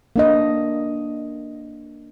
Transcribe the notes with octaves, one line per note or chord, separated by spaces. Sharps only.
A#3 D4 D#5